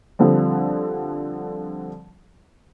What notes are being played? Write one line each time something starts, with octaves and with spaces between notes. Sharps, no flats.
D3 F3 G3 C4